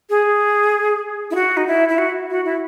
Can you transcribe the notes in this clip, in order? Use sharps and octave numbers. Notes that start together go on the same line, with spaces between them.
G#4
E4
F#4
D#4
E4
E4
F#4
F#4
E4